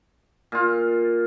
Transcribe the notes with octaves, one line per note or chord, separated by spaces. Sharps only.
A#2 F4